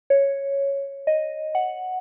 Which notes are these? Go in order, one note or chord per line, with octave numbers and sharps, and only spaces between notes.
C#5
D#5
F#5